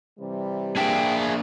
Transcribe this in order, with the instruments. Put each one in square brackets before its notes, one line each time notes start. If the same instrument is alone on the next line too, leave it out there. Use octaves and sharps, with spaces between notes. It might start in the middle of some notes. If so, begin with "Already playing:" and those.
[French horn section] C3 E3 G3
[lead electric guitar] A#3 D4 [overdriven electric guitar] G#4 E5 [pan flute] G5